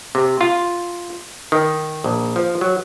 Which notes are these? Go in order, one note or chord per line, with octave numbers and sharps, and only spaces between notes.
C3
F4
D#3
A#1
F3
F#3